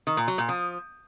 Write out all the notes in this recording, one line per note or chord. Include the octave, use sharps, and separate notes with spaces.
D#3
A#2
F#3
A#2
F3